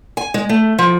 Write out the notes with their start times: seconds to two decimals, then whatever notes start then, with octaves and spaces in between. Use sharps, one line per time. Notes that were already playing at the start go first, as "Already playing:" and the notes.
0.17 G#5
0.34 G#3
0.49 A3
0.79 F3